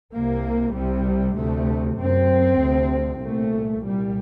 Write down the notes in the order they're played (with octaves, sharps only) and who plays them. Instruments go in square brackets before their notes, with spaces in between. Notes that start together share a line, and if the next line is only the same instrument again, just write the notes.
[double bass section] C2 C3 A#3
C2 C3 G3
D2 C3 A3
F#2 C4
D2 C3
C2 A#2 A3
C2 A#2 G3